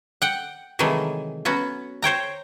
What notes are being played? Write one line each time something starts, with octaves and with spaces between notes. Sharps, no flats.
F#5 G5
C3 D#3 E3 F#3 G#3 A3
F#3 B3 C#4 F#4
C5 C#5 G5 A#5